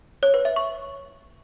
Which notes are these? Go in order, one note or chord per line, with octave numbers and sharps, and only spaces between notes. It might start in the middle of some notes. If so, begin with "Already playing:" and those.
C#5
B4
E5
C#6